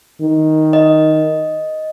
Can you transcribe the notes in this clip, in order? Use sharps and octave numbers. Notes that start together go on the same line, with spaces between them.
D#3
D#5